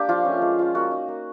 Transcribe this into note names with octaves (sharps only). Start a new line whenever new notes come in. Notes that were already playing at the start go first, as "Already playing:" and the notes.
Already playing: A#3 D4 G4
F3 F4
A3 C#4
G#3
C#4 F4
A#3 F#4
D#4
A#3